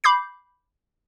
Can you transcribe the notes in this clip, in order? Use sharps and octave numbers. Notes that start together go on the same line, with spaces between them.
B5 D6 G6 C7